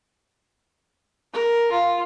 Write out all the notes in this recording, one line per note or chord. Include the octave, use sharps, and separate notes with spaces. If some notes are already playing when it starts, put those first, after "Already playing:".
A#4
F4